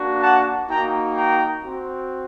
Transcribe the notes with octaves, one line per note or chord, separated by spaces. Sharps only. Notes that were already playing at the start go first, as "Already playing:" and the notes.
Already playing: A#3 D4 F#4
F#5 A5
A#3 D#4 F#4 G5 A#5
G5 A#5
C4 F#4